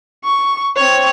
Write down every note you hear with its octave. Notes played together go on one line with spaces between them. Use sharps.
C#6
C4 C#5